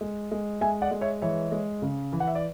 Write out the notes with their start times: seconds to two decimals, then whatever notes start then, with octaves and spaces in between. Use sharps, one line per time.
0.01 G#3
0.32 G#3
0.61 G#3 E5 G#5
0.82 D5 F#5
0.91 G#3
1.01 C#5 E5
1.22 E3 C#5 E5
1.52 G#3
1.82 C#3
2.13 E3
2.20 F#5
2.27 E5
2.35 D5